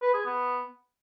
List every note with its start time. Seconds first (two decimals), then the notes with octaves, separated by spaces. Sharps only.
0.02 B4
0.14 G#4
0.25 B3